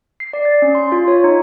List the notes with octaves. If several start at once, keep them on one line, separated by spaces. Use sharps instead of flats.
C7
D5
A6
C#4
C6
F4
C#5
D#4